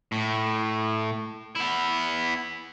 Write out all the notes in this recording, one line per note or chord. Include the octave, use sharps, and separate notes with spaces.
A2
B3 E4